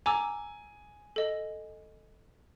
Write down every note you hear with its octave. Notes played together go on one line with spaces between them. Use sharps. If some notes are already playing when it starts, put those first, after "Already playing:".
G#5 A#5 D6 E6
A4 D#5